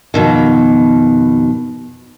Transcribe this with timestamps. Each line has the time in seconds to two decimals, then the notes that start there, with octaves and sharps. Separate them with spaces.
0.14 F2 B2 D#3